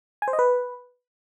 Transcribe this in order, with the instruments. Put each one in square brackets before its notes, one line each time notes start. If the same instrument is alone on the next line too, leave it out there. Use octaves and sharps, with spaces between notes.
[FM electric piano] G#5
C5
D#5
B4